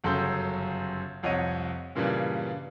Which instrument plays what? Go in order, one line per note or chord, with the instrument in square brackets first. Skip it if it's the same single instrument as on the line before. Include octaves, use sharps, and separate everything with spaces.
[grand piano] G1 F#2 C#3 A4 C6 G6
C2 F2 C#5 D#5 F#5 D#7
G2 A#2 C#3 E3 G3